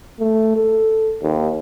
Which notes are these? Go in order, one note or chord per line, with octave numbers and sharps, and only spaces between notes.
A3
A4
D#2